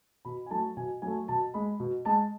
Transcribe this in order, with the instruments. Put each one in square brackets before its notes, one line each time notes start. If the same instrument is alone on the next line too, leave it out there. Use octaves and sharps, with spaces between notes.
[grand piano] B2 B5
G#5
F#3 A3 A5
B2 G#5
F#3 A3 G#5
B2 A5
G#3 B5
B2
G#3 A5